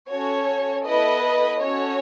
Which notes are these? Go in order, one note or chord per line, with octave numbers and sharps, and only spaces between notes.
C#4 F#4 A4 C#5
B3 E4 A4 B4 D#5
C#4 F#4 A4 C#5